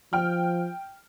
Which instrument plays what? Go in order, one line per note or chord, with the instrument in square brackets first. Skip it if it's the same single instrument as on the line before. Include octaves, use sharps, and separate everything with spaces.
[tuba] F3 [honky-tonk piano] G5 F6